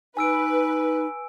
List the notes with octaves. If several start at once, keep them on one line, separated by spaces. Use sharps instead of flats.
D#4 B4 G#5 E6 D7